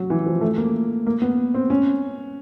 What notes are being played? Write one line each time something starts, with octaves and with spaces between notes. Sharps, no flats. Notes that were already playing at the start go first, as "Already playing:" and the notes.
Already playing: F#3
E3
F3
A3
A#3
A#3
B3
C4
C#4